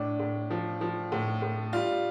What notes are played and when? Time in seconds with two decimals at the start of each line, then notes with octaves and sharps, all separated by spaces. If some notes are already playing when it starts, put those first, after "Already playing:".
Already playing: A2 D4
0.20 A2
0.50 F3
0.81 F3
1.12 A2
1.42 A2
1.73 G3 F4